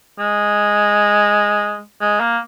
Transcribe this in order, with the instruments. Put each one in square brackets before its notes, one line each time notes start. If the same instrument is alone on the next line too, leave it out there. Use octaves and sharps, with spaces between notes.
[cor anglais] G#3
G#3
A#3